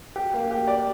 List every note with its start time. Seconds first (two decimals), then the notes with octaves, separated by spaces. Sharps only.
0.16 G4
0.34 A#3
0.51 G4
0.67 D5